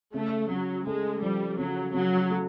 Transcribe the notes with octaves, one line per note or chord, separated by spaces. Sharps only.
C#3 A3
C#3 F#3
G#3 A3
F3 G3
C#3 F#3
C#3 F#3
A3